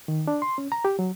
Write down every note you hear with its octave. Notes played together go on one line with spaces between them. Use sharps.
D#3
D4
C6
C#4
A#5
G4
F#3